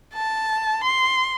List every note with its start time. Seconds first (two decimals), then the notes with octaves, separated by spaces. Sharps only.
0.14 A5
0.83 C6